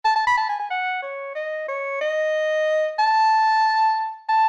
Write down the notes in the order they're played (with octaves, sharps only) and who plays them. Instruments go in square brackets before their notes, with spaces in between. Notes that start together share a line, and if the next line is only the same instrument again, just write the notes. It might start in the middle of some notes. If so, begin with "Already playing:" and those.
[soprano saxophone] A5
A5
B5
A5
G#5
G#5
F#5
C#5
D#5
C#5
D#5
A5
A5